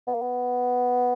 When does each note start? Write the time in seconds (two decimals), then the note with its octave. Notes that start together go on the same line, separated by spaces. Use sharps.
0.07 B3
0.14 A#3
0.21 B3